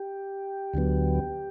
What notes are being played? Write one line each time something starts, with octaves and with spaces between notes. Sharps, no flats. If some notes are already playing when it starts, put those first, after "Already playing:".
Already playing: G4
D2 D3 F#3 B3